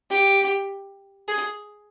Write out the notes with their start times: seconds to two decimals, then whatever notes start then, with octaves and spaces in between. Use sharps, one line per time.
0.10 G4
1.28 G#4